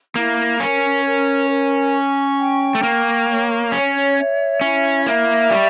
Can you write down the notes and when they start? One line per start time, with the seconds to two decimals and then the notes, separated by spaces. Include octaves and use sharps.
0.16 A#3 E4
0.60 C#4 A#4
1.04 A#4
1.50 A#4
1.93 C#6
2.38 G5
2.75 A3
2.83 A#3 C#6
3.28 C#5
3.72 C#4 C#5
4.17 E5
4.61 C#4 E4
5.06 A#3 E5
5.51 G3 C#6